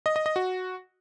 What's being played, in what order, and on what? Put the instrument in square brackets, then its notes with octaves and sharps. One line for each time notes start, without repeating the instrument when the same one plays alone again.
[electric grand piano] D#5
D#5
D#5
F#4